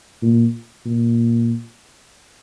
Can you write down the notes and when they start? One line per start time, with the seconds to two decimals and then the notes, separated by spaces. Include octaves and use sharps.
0.22 A#2
0.85 A#2